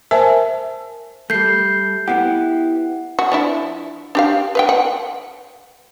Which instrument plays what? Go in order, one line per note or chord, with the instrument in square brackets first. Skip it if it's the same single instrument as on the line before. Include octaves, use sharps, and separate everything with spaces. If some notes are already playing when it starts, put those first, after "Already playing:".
[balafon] A#4 C5 E5 G#5 A5
[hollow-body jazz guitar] G3 A3 [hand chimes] G6 C7
[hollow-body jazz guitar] B3 E4 G4 [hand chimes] F#5
[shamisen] F#4
F3 D4 E4
D4 G4 F5
B4 F5 G5
F#5